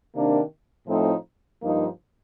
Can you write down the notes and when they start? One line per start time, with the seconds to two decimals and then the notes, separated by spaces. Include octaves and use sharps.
0.13 C3 D#3 A#3 D4
0.87 A2 F3 A3 C4 D#4
1.61 G2 F3 A#3 D#4